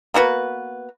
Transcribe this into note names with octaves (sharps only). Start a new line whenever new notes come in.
A#3 B3 F#4 B4